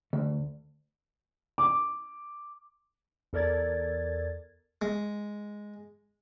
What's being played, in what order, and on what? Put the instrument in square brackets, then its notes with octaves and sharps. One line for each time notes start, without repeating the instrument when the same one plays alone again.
[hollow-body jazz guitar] D2
[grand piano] D6
[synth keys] E2 A4 A#4 D5 G#6 A6
[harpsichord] G#3